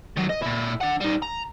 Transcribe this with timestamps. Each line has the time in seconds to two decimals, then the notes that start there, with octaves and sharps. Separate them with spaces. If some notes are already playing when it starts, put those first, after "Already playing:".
0.17 D#3 F#3
0.30 D#5
0.43 A#2 E4
0.81 D4 F#5
1.01 G3 D#4
1.22 A#5